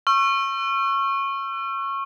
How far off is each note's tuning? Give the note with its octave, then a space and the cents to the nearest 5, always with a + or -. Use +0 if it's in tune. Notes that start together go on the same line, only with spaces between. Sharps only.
C#6 -20 E6 +45